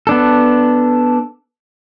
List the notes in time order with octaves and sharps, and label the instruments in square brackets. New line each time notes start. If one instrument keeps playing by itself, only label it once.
[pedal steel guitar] B3 D4 A4